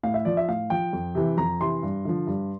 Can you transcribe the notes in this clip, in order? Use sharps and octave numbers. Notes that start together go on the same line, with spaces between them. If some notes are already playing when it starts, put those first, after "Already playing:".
A2 F5
E5
F3 D5
E5
A2 F5
F3 G5
F2
C3 E3
F2 A#5
C3 E3 C6
G2
D3 F3
G2